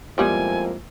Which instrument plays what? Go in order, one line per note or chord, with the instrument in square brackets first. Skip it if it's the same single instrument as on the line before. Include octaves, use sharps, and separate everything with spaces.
[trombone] F2 [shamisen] F3 G3 B3 [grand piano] G#3 A#3 E4 [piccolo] G#5